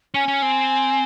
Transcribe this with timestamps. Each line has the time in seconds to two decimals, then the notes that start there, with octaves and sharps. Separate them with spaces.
0.14 C#4 G#5
0.28 C#4
0.42 C4